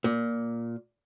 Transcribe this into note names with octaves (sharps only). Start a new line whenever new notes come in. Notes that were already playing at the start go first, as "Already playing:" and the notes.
A#2